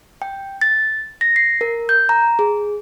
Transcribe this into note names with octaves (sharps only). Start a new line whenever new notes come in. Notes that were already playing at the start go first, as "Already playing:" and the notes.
G5
A6
A#6
C7
A#4
G6
A#5
G#4